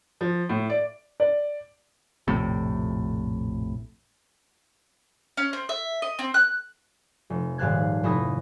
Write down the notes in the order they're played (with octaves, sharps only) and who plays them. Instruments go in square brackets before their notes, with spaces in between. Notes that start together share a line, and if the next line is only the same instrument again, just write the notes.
[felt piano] F3
A2
D5
D5
[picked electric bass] A#1 F2 A2 C3
[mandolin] C#4
C4
E5
D#5
C4
F#6
[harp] F1
D#1 G#2 F5 A5 F#6 G#6
F1 E4 B5 D#6 A#6